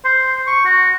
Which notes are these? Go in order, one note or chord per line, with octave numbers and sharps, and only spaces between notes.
C5
C#6
F#4